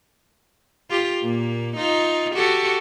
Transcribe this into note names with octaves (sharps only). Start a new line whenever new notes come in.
F4 G4
A#2 A#3
D#4 F4
F#4 G4 A4